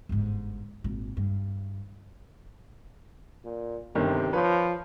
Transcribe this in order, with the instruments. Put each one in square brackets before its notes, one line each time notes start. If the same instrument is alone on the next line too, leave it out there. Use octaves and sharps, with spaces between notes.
[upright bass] G1 G#2
G#1 A#2
G2
[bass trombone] A#2
[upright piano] G1 D#3 [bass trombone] C3
[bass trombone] F3 [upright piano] B4 C#5